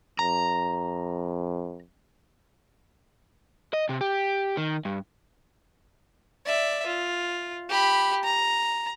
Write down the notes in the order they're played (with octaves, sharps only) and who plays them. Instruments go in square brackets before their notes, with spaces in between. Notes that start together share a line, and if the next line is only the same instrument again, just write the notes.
[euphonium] F2 [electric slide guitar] A#5
[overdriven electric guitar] D#5
C3
G4
D#3
G2
[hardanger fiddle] D5 E5
F4
G4 B5
A#5